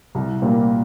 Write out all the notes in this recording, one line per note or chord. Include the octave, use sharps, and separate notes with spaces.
C2
A#2 G3 A#3